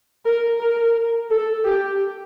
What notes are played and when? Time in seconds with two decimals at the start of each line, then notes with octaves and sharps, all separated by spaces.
0.25 A#4
0.60 A#4
1.30 A4
1.65 G4